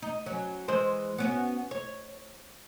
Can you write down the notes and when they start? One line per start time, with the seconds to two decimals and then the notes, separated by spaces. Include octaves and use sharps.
0.02 D#4
0.26 F#3 C#4
0.68 E3 G#3 C5
1.18 B3 C#4 F#4
1.71 C#5